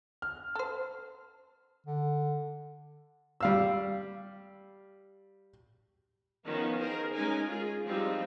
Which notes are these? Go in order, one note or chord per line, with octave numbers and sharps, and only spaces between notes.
F6
A4 C5
D3
G3 F5 E6
D#3 F3 B3 C#4
G#4 A#4 C5
G#3 A3 C#4 D#4 A#4 G#5
F4 G#4
F3 G3 G#3 C4 D#4 F4